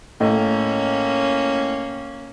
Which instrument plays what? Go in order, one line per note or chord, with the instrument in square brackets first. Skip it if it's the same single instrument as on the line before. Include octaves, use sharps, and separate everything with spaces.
[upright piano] A2 D#5 [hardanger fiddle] A#3 C#4